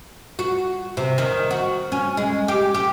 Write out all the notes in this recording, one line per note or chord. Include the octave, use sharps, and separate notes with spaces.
F#4
C3
D#3
F#4
C#4
G#3
G4
G4